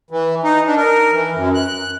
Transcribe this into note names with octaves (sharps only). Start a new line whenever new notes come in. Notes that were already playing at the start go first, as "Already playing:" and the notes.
E3
D#4
D4
A#4
E3
F#2
F#6